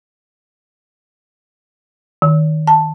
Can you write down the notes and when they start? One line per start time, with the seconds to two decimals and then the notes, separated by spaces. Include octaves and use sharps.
2.22 D#3
2.67 A5